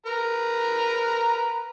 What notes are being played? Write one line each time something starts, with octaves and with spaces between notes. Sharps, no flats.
A#4 B4 A#5